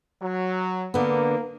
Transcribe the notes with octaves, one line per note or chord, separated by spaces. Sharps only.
F#3
D3 A#3 B3